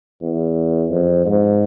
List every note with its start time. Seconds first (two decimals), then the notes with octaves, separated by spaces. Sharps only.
0.22 E2
0.90 F2
1.26 G#2